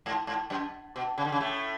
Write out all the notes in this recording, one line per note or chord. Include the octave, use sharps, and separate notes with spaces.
G#2
G#2
F#2
B2
C#3
D3
C#3
A2 A3